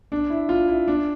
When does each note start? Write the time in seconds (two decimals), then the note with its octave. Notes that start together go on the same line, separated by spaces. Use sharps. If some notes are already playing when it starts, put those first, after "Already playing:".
0.12 D4
0.30 E4
0.49 F4
0.68 E4
0.88 D4